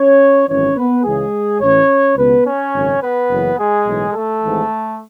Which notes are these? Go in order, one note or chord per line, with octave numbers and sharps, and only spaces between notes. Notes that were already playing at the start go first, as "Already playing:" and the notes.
Already playing: C#4 C#5
G#1 F#2 E3 C#4 C#5
B3 B4
C#2 C#3 E3 G#3 G#4
A1 A2 E3 C#4 C#5
C#2 B2 B3 B4
C#4 C#5
G#1 F#2 C#3
B3 B4
F#1 F#2 C#3 E3
G#3 G#4
B1 A2 E3
A3 A4
G#1 G#2 E3